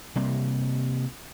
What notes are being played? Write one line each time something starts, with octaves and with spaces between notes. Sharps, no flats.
C3 G3 A#3